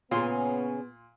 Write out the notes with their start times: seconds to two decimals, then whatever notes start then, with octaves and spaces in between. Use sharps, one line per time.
0.11 A#2 C#3 B3 C#4 C6